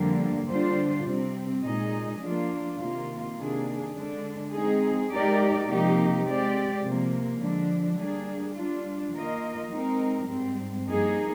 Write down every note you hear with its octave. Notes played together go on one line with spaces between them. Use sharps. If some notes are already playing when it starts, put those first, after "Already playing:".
Already playing: F2 D3 G3 A#3
D3 G3 D4 F4 C5
C3 G3 C4
A#2 G#3 D#4 G#4 D#5
F3 A#3 D4 F4
C3 D#3 A#3 F4
C3 D#3 A#3 D4 G#4
D3 G#3 D4
G#3 C4 D#4 G#4
G#3 D#4 G4 A#4 D5
C3 F3 A#3 D#4 G4
G#3 C4 G4 D5
C3 F3 A#3
D3 F3 G#3 D4
G3 A#3 D4 G#4
G3 D4 F4
D#3 A#3 F4 A#4 D#5
G#3 C4 D#4 A#4
G#2 G3 C4
G2 F3 A#3 D#4 G#4